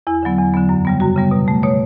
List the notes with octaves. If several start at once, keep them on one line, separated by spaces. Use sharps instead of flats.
E2 E4
D3 F#3 B3
E2
D3 F#3 B3
F#2
C#3 G3 B3
F#2 F#4
C#3 G3 B3
B2
A3
B2 C#5